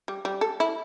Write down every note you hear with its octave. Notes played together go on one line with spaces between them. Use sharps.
G3
G3
A4
E4